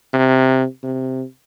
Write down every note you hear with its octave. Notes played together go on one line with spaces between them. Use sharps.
C3
C3